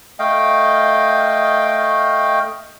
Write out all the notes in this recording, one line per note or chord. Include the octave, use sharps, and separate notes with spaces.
A3 D#5 F5 G5